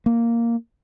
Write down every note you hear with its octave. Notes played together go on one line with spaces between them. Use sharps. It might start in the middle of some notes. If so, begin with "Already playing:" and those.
A#3